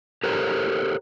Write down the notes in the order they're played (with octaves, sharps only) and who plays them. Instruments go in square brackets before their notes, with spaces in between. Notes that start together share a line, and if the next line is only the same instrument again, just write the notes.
[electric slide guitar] G4 A4 A#4 C5 C#5